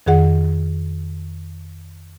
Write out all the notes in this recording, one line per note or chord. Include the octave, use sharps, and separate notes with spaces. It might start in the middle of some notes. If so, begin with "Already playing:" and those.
F2 D#3 G#4 F#5